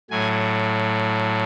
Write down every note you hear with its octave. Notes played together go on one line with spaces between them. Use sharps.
A2 F#3 G#5